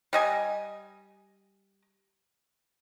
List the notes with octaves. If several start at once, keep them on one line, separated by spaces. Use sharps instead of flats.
G3 D#5 G#5